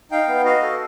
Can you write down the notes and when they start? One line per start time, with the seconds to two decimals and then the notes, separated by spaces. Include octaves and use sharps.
0.11 D#4 F5 G5
0.28 B3
0.44 F#4 D#5 F5
0.62 A4